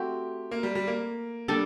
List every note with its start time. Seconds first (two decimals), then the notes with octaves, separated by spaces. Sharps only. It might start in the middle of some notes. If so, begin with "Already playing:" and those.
Already playing: A3 C4 F#4 G4
0.51 A#3
0.63 G3
0.75 G3
0.87 A#3
1.48 G3 D4 A4